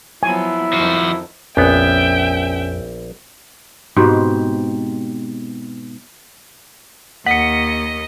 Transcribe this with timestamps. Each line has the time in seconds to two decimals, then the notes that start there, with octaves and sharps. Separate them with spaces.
0.23 F3 F#3 B3 E4 G#5
0.73 F2 D#3 F3 F#4
1.57 A#1 F2 B3 C#4 E5 G5
3.96 G#2 B2 C4 G4
7.26 D#2 D#5 F#5 B6 C#7